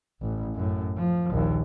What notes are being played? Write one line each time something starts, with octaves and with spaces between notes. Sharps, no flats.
A1
F#2 A2
F3
A#1 D#2